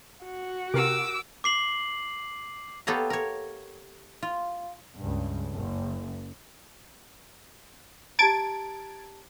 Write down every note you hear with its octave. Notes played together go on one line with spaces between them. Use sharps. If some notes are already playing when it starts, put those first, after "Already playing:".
F#4
C3 G4 A#4 D6 E6
D6 C7 F#7
B3 G4 A4 C#5 F5 A#5
A#4 C#5
F4
C#2 G2
F#1
G4 A5 A#5 G#6 A6 D7